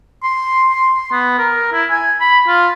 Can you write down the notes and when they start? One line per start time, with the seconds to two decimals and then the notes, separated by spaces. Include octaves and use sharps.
0.23 C6
0.69 C6
0.95 C6
1.11 B3
1.39 A#4
1.72 E4
1.90 G#5
2.20 B5
2.47 F4